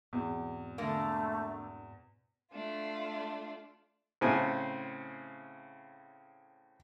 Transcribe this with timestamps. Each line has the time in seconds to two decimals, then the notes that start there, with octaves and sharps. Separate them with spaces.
0.13 E2 G#2 B2 C4
0.78 D3 A3 A#3
2.52 A3 D4 F4
4.21 A2 C#3 C4 G#5